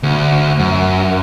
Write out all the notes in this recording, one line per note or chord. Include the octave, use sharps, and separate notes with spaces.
D2
F#2